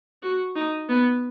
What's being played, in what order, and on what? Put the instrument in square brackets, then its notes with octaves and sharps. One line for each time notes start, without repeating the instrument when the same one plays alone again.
[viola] F#4
D#4
B3